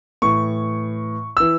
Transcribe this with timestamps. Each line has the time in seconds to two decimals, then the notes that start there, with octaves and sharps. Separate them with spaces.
0.22 A2 E3 C#6
1.37 E3 E6